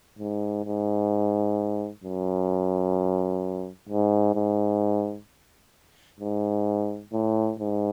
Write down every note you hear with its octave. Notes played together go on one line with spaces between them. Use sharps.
G#2
G#2
F#2
G#2
G#2
G#2
A2
G#2